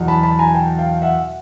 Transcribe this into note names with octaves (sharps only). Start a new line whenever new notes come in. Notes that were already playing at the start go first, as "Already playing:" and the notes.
Already playing: E2 B2 F#3
A5 B5
A5 B5
G#5 A#5
G5 A5
F5 G5
E5 F#5